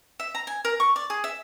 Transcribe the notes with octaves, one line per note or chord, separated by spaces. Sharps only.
E5
A#5
G#5
A#4
C#6
D5
G#4
E5